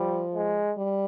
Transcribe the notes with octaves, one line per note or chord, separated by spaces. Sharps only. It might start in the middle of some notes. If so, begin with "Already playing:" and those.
Already playing: F3 G3
G#3
G3